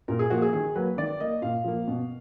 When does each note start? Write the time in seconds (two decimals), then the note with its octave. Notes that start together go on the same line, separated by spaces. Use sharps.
0.08 A#2 A#4
0.19 G#4
0.30 F3 A#3 F#4
0.42 G#4
0.53 D#3 G#4
0.75 F#3 A#3 B4
0.97 D#3 D5
1.20 A#3 D#5
1.42 A#2 F5
1.64 F3 A#3
1.88 B2